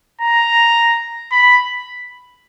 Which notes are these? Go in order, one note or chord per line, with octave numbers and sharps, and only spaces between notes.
A#5
B5